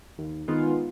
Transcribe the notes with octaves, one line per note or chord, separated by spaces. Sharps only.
D#2
D#3 G#3 B3 F4